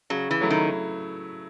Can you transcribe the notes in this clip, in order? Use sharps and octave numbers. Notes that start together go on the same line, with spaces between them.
C#3 F#3
E3
F#3 A3 E4
D#3